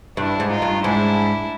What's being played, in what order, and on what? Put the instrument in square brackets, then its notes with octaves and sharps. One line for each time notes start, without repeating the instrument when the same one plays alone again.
[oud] G2 [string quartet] D4 E4
[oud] G#2
[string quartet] D#4 F4
[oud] G2
[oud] G#2 [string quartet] D4 E4